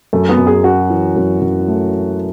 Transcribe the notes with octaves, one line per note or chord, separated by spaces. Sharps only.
F#2 A3
B3
F#2
G#4
C#4 F#4
E3
F#2
F#2
A3